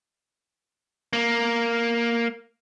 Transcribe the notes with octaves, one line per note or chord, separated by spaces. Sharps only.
A#3